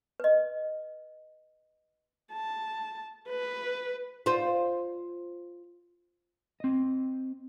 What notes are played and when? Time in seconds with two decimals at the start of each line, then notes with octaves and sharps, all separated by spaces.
0.20 B4 D#5
2.33 A5
3.29 B4
4.26 F4 C5
6.60 C4 D#5